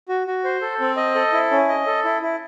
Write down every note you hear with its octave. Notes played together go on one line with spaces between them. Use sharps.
F#4
F#4
C5
A4
C4
D#5
A4
E4
C#4
D#5
A4
E4
E4